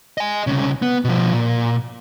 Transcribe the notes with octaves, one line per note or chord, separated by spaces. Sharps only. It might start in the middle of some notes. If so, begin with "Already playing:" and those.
D#5 G#5
C2 C#3
B3
B2 F3
A#2